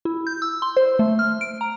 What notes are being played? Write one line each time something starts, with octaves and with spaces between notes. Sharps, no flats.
E4
G6
E6
C6
C5
A3
F6
D7
A#5